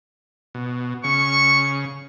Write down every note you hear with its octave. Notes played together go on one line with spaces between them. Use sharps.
B2
C#3 C#6